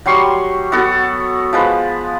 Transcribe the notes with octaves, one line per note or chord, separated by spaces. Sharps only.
F#3 G3 C6 C#6
B3 F#4 A4
F3 G#3 B4